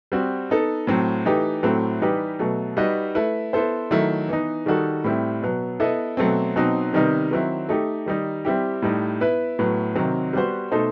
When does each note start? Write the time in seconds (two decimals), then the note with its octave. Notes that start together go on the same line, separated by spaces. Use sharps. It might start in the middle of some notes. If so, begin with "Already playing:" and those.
0.12 G3 C4 F#4
0.50 B3 D#4 A4
0.87 A2 F#3 C4
1.25 E3 A3 D#4 G4
1.63 A2 F#3 A3 C4
2.01 E3 G3 D#4 G4 B4
2.39 B2 F#3 A3
2.77 G3 D#4 F#4 B4 D#5
3.15 A3 E4 B4
3.53 B3 E4 A4 C5
3.91 D#3 F#3 A3 E4
4.28 E3 B3 D#4
4.66 D#3 G3 D#4 F#4 A4
5.04 A2 G3 C4 E4
5.42 B2 F#3 B3
5.80 B3 E4 A4 D#5
6.17 B2 F#3 A3 C4
6.56 B2 F#3 C4 D#4
6.93 C3 D#3 G3 B3 D#4
7.31 D#3 F#3 C4 E4
7.69 A3 D#4 G4
8.06 D#3 G3 D#4
8.45 G3 C4 E4 G4
8.82 A2 G3 D#4
9.20 B3 E4 B4
9.59 A2 F#3 B3
9.95 C3 D#3 F#3 C4
10.33 G3 B3 F#4 C5
10.72 B2 A3 D#4 A4 C5